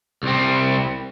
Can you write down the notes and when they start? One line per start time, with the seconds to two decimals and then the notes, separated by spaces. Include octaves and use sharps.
0.23 C2 C4